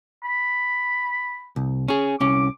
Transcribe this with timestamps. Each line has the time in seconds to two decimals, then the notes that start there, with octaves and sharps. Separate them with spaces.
0.24 B5
1.56 C2
1.88 C#4 G#4
2.20 C2 C#4 D6